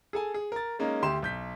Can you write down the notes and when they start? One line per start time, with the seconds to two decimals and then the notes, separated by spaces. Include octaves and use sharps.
0.13 G#4 A4 G#5
0.34 G#4
0.52 A#4 A6
0.79 G#3 A#3 C#4 D#4
1.02 D2 G4 C6 E7
1.22 B1 G6 B6